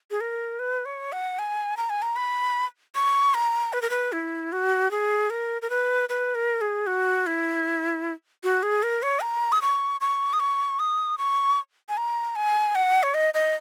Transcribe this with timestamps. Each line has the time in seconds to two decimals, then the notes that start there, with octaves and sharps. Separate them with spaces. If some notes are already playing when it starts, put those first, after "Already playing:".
0.11 G#4
0.21 A#4
0.59 B4
0.85 C#5
1.12 F#5
1.39 G#5
1.77 A#5
1.90 G#5
2.02 A#5
2.16 B5
2.95 C#6
3.34 A#5
3.73 B4
3.82 A#4
3.90 B4
4.12 E4
4.52 F#4
4.91 G#4
5.30 A#4
5.62 A#4
5.70 B4
6.09 B4
6.35 A#4
6.61 G#4
6.87 F#4
7.27 E4
8.44 F#4
8.63 G#4
8.83 A#4
9.03 C#5
9.22 A#5
9.52 D#6
9.62 C#6
10.01 C#6
10.33 D#6
10.40 C#6
10.79 D#6
11.18 C#6
11.89 G#5
11.97 A#5
12.36 G#5
12.75 F#5
13.03 C#5
13.14 D#5
13.34 D#5